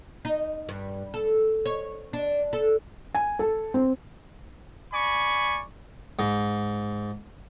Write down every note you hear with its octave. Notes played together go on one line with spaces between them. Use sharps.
D#4
G2
A4
C#5
D4
A4
G#5
A4
C4
D5 G#5 B5 C#6
G#2